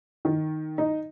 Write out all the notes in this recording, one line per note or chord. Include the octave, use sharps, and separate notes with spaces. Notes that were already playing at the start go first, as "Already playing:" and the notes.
D#3
D#4